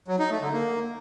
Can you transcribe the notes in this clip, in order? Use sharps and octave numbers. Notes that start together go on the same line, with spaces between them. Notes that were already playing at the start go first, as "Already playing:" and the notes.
F#3
D#4
A3
D3
A#3